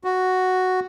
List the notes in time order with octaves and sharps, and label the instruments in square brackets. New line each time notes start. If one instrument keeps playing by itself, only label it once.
[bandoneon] F#4